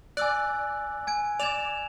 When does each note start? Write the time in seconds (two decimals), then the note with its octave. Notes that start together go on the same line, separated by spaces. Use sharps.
0.17 D5 G#5 E6 F#6
1.07 G#5 G#6 D7
1.40 D5 G#6 E7 F7